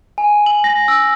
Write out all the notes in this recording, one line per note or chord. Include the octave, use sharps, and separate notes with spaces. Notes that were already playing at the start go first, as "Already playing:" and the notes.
G#5
F#7
A#6
E6